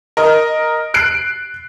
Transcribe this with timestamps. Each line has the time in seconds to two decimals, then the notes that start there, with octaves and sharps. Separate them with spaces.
0.17 A#4 D#5
0.94 F#6 C7 D7